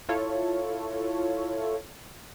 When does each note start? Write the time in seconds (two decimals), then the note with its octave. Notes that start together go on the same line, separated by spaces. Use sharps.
0.09 E4 F4 A4 C#5